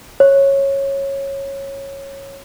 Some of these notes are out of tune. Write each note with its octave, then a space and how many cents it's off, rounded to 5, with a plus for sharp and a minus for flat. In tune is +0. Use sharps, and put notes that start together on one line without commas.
C#5 -15